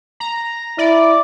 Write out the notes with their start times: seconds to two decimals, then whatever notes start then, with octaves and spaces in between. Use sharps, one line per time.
0.20 A#5
0.78 E4 D5